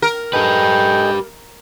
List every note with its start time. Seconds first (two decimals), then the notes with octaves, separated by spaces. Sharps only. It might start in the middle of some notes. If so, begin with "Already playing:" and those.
0.02 A#4
0.33 G4 A4 B4 D#5 G5 G#5